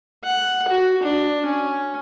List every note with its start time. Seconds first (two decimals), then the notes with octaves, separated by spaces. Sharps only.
0.24 F#5
0.68 F#4
1.03 D4
1.46 C#4